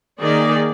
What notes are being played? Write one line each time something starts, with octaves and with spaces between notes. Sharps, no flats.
D#3 A#3 D#4 G#4 D5